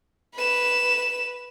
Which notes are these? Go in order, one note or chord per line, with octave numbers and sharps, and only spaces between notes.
B4 E7